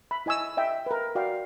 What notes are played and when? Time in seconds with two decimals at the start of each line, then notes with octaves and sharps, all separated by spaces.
0.11 B5
0.26 E4 D#5 G#5 C#6 E6
0.57 D#5 E5 G5
0.86 A#4 B4
1.15 F#4 D5 F5 G5